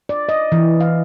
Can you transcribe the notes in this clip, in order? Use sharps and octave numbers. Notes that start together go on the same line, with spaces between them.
D5
D#5
E3
F5